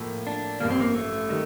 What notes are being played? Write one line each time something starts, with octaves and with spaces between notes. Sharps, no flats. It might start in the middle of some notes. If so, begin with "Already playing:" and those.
Already playing: A2 F3 A#3
D4
A1 G2 F3 A#3
C4
A#3
A3
D#3 G3